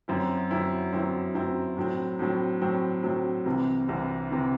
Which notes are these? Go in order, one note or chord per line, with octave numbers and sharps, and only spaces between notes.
F#2 F#3 C4 E4
F#2 F#3 C4 E4
F#2 F#3 C4 E4
F#2 F#3 C4 E4
A2 F#3 C4
A2 F#3 C4
A2 F#3 C4
A2 F#3 C4
C2 C3 E3
C2 C3 E3
C3 E3